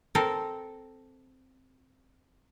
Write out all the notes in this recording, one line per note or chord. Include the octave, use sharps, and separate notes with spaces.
C4 A4 A#4